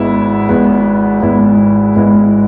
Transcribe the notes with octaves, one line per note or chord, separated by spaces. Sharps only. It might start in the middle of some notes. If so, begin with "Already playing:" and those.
Already playing: G#1 G#2 G#3 B3 E4
G#1 G#2 G#3 B3 E4
G#1 G#2 G#3 B3 E4
G#1 G#2 G#3 B3 E4